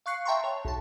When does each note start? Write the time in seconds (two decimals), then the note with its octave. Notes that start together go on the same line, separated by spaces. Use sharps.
0.06 F5 C#6 F#6 C7 C#7
0.25 E5 G5 A5 A#5 C6 C#6
0.44 C#5
0.65 B1 A5